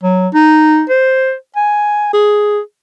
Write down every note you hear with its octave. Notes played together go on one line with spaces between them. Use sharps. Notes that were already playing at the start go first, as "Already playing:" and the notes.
F#3
D#4
C5
G#5
G#4